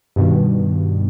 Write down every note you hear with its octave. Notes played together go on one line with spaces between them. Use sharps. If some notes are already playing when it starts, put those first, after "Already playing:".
G2 B2 D#3